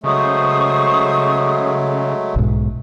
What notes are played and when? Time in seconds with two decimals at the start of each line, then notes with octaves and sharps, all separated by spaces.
0.04 C#3 F#3 G#3 A3 C5 C#6 D#6
2.36 B1 G#2